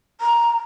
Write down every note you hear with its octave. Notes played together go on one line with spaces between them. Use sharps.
A#5